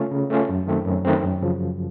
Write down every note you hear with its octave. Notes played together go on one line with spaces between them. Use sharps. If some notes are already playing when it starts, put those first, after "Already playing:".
Already playing: C#3 A3 C#4 F4
C#3
A3 C#4 F4
F#2
D#3 A3 C4
F#2
D#3 A3 C4
F#2
C#3 F3